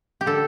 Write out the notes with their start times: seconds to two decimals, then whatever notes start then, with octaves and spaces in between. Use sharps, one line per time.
0.21 G4
0.26 D3 A4